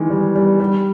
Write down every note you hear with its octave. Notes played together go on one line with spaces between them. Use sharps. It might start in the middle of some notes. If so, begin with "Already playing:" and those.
Already playing: D#3 E3 G#3
G3
G3
G3